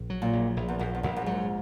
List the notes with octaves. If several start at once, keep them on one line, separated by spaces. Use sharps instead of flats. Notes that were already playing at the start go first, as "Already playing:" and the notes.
Already playing: A#1
F#3
A#2
A#1
A#1
E2
A#1 F#2
E2
A#1 F#2
F#2
G#2 F#3